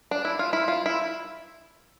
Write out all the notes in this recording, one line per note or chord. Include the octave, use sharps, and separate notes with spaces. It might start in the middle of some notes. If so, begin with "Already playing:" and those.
D4
E4
F4
E4
F4
E4